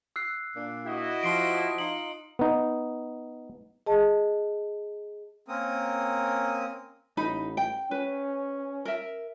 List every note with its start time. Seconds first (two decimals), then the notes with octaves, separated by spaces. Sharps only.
0.16 E6 F#6 C7
0.56 A#2 A#3 D4
0.86 E4 F#4 D#5
1.23 F3 C6 C7 D7
1.78 D#4 F4 D#5 F#7
2.39 B3 D#4
3.86 G#4 D#5 A5
5.48 A#3 C4 C#4 A#4 D#6
7.17 A1 D#4 B5
7.57 G5
7.91 C#4 B4
8.85 A#4 E5